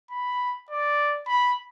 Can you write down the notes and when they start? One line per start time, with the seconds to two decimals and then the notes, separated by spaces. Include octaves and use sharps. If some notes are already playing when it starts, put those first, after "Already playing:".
0.11 B5
0.71 D5
1.28 B5